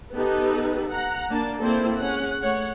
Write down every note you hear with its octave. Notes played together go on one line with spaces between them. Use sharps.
B3 D#4 G4 A4 B4
F#5 A#5
A#3 D4 A5
A#3 C4 E4 A4 C5
C#4 G#4 F#5
A3 C#5 F#5